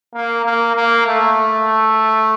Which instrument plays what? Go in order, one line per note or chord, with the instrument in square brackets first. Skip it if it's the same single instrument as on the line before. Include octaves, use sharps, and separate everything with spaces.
[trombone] A#3
A#3
A#3
A3